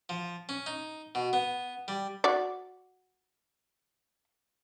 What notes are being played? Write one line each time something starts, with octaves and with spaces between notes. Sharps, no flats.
F3
C#4
D#4
B2
B3
G3
F#4 D5